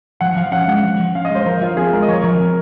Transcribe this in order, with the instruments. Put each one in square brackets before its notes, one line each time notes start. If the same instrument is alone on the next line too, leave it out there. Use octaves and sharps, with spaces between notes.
[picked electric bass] F3 [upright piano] F#5
[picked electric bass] F3 [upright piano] F5
[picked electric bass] C#4 [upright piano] F#5
[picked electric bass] G#3 [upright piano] F#5
[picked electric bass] F3
F3
[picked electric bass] C#4 [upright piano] F5
[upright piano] D#5
[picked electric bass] G#3 [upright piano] C5
[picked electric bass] F3 [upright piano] A#4
[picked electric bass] F3 [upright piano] F4
[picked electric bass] C4 [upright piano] G#4
[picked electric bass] G#3 [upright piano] A#4
[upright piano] D#5
[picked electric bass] F3 [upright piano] C#5
[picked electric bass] F3 [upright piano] A#4
[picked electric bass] C4